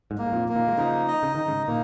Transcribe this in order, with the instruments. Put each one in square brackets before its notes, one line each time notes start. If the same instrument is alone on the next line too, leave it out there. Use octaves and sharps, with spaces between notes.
[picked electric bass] G#2
[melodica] A#3
[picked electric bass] G#2
F2 A#2
[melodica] A#3
[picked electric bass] A#2 D#3
G#3
[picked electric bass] C#3 F3 [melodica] D#4
[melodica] D#5
[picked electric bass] C#3
[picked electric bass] D#3 [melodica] D#4
[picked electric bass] G#2 C#3
[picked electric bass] A#2 D#3 [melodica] A#3